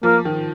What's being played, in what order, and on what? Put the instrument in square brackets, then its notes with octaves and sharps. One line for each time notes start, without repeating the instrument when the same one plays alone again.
[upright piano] F3 [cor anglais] A#3
[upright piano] D#3